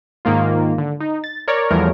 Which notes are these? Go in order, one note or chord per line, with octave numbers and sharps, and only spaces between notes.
G#2 D#3 A#3 F4
D3
D#4
A6
A#4 C#5 D5 A#5
E2 F3 G3 A3 A#4 C#5